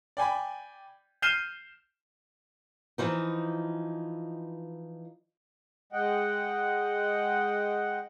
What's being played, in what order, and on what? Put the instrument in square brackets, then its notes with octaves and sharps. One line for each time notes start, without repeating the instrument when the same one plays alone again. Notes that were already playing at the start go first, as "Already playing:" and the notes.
[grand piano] D5 G5 G#5 B5
F6 G6 C7 D#7 E7 G7
[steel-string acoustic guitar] E3 F3 D#4
[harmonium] G#3 D#5 F#5 G5